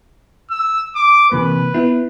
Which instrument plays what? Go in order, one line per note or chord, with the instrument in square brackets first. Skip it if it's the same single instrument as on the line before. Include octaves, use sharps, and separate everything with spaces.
[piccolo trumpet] E6
D6
[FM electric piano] C3 E3 A#3 [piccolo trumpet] B4
[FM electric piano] B3 E4